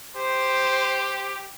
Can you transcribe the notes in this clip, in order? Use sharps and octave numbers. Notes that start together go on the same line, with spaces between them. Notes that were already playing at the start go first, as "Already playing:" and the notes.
G4 C5